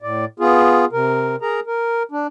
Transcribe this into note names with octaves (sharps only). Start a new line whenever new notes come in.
A2 D5
B3 F4 G#4
C3 A#4
G#4 A#4 A#5
A#4
D4